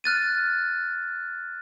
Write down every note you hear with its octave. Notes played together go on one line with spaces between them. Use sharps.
F6 F#6 A6 D#7